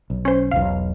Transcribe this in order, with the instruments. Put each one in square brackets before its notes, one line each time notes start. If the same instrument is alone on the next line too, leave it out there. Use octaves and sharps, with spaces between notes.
[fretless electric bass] B1
[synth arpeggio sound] C#4 C5
[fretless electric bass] E1 B1 [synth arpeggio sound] F5